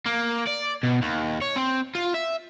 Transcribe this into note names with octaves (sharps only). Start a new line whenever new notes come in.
A#3
D5
B2
D#2
C#5
C4
F4
E5